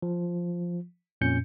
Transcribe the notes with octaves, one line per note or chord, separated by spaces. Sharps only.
F3
F2 A#2 C#4 G6 C#7